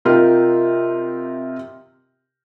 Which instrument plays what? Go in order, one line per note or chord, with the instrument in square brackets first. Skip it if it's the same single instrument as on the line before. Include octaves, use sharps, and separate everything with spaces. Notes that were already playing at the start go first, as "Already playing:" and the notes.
[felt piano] C3 D#4 F4 G4 A#4